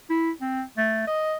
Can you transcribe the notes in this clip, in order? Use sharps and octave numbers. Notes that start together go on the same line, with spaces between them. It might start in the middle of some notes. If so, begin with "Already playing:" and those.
E4
C4
A3
D#5